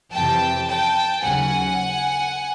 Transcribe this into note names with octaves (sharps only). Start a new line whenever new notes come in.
F2 C3 E3 G5 A5
G5 A5
D#2 C#3 F#3 F#5 G#5